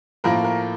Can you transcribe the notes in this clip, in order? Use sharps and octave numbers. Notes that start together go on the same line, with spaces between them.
A2 F3 A#3 A#4
A#4